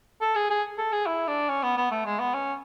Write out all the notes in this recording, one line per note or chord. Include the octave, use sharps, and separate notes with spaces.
A4
G#4
G#4
A4
G#4
E4
D4
C#4
B3
B3
A3
G#3
B3
C#4